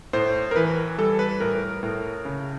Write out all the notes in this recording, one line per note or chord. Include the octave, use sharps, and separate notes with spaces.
A2 C5
A#4
E3 B4
G3 A4
B4
A2 A#4
A2
C#3